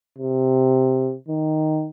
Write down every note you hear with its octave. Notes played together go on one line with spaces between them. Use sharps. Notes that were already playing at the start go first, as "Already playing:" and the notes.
C3
D#3